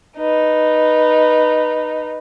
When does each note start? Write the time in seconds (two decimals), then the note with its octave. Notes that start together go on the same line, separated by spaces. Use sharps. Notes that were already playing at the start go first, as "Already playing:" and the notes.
0.17 D#4 B4